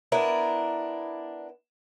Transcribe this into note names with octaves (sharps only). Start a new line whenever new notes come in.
B3 D4 E4 A#4